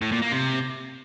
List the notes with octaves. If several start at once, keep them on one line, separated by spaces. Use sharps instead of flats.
A2
A#2
A#3
C3